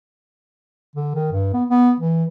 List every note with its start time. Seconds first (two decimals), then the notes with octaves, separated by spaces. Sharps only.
0.96 D3
1.15 D#3
1.32 G2
1.54 B3
1.70 B3
2.01 E3